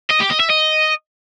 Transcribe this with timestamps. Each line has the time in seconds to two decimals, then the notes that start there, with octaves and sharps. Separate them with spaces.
0.10 D#5
0.20 G4
0.30 D#5
0.40 E5
0.50 D#5